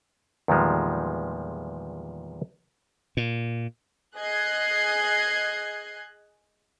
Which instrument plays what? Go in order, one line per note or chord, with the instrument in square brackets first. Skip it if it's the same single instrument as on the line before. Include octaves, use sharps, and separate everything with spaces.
[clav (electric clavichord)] E2 A#2 D#3 F3 G3 G#3
[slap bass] A#2
[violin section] G#4 D#5 F#6 G#6 C7